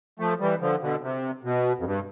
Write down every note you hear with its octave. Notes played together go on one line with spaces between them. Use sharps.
F3 A3
E3 G3
D3 F3
B2 D3
C3
B2
F2
G2